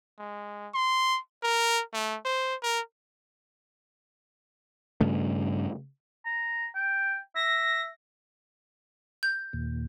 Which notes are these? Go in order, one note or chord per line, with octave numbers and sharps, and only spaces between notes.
G#3
C6
A#4
A3
C5
A#4
G2 C#3 A3
A#5
G5
E5 A#6
G6
D#2 A#2